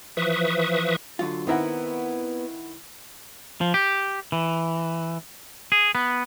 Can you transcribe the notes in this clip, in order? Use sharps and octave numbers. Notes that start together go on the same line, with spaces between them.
E3 F3 B4 E5 C#6 D#6
D3 F#3 F4
D#3 B3 C4 E4 A#4 F#5
F3
G4
E3
G#4
B3